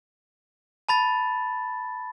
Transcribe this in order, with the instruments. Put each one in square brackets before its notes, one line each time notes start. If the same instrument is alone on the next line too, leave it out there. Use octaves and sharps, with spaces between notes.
[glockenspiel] A5 B5 A6